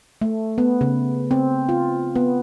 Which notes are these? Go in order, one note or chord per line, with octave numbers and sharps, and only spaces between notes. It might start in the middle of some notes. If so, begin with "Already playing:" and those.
A3
B3
C#3
C4
F4
B3